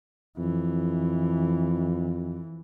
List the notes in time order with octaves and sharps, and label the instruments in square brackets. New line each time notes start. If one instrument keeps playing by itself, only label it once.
[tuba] F2 [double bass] E3